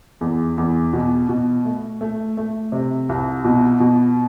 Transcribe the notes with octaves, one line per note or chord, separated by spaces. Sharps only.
E2
E2
B2
B2
A3
A3
A3
C3
C2
B2
B2